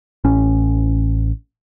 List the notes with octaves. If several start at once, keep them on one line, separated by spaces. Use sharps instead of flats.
A1 C#4